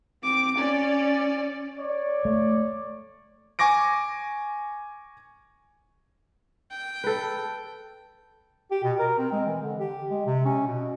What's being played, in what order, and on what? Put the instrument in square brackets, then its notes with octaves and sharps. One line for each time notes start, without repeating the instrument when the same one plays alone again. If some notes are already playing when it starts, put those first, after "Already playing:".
[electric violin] C4 D6
C#4 D5
[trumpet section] C#5 D5
[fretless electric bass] A3
[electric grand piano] G#5 C#6 D6 A#6 D7
[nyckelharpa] G5
[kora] A4 B4
[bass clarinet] G4
B2
A#4
C4
G#3
E3
D3
G4
G#3
C3
C#4
B2